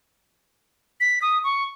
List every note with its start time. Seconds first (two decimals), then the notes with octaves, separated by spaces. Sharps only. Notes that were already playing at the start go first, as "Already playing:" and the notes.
1.00 B6
1.22 D#6
1.44 C#6